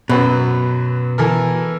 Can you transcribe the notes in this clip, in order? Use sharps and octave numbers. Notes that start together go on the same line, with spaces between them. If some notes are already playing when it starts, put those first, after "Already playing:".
F#2 B2 F#3 B4
E3 A4 A#4